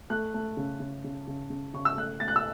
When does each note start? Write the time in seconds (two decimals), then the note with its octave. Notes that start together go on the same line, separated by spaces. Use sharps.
0.10 A3 F#6
0.34 A3
0.57 C#3
0.80 C#3
1.04 C#3
1.27 C#3
1.50 C#3
1.74 C#3 C#6
1.85 E6
1.97 A3 F#6
2.20 A3 A6
2.28 F#6
2.36 E6